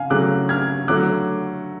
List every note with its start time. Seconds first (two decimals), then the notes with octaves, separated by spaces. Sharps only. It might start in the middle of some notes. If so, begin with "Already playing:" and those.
Already playing: C#3 F5 G#5
0.10 C#3 F#3 A3 D6 F#6
0.49 F6 G#6
0.88 D3 F#3 A3 D6 F#6